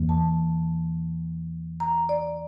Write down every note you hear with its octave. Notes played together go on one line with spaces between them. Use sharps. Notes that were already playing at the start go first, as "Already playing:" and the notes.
Already playing: E2 E3 A#3
A5
A#5
D5